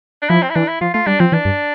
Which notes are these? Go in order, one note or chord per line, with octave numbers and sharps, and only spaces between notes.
D4
F3 E4
C4
E4
E3 D4
E4
F3 F4
A3 F4
G3 D4
F3 C4
E3 D4
G2